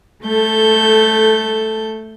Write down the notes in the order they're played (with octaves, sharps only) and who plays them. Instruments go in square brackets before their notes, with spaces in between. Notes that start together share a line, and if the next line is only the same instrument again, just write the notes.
[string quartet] A3 A4 G6